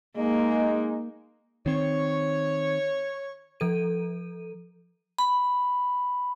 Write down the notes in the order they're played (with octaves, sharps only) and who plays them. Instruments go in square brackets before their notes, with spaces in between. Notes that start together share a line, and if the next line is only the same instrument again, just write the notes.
[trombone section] G#3 D#4 [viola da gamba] A#3
[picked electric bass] D#3 C4 [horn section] C#5
[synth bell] F3 A4 D#7
[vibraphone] B5